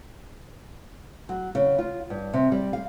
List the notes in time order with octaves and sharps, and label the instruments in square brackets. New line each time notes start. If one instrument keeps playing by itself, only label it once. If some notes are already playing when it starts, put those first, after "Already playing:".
[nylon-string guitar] F#3
C#3
F4
G2
C3
G3
F5